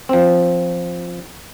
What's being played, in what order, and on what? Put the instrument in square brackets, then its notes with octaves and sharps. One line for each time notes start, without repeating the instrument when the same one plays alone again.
[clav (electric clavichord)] F3 C4